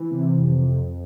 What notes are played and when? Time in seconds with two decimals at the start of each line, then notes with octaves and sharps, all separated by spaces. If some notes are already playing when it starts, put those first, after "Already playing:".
Already playing: E3
0.11 C3
0.39 F2
0.67 F2